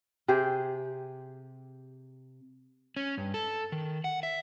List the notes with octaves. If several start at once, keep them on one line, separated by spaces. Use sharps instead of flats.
C3 G4 G#4 C5
C#4
G2
A4
D#3
F#5
E5